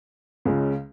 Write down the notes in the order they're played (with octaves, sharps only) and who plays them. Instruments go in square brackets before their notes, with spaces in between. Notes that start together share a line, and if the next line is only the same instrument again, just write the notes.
[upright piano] C#2 C#3 G#3 C#4 F4